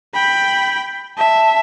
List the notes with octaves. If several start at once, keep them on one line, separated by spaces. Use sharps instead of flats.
G5 B5
E5 A5